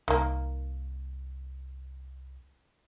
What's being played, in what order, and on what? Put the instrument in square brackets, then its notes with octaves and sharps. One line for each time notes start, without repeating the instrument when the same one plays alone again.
[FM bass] C2 [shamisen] D#3 A#3